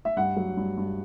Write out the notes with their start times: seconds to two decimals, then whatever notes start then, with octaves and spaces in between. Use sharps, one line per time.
0.05 E5
0.16 G2 F#5
0.36 F#3
0.57 G2
0.77 G2